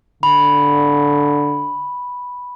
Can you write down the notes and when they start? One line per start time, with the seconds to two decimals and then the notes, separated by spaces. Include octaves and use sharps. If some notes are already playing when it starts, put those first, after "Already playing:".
0.23 D3 B5